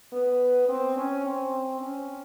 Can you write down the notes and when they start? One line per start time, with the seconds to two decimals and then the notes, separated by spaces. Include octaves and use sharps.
0.13 B3
0.69 C4
0.97 C#4
1.25 C4
1.81 C#4